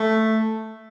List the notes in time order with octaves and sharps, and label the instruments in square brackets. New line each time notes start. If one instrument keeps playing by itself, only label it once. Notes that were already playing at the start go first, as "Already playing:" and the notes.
Already playing: [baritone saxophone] A3